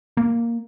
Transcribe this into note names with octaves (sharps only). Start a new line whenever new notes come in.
A#3